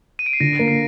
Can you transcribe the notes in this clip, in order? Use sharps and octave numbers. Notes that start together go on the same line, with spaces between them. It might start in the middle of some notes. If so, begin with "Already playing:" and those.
D#7
D7
C7
D3 A#6
A#3
C7